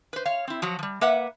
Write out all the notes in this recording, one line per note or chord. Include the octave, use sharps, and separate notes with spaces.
B4 C5
C#5 F5
C4 E4
F3 F#3 F#4
F3 G3
A#3 B4 E5 F#5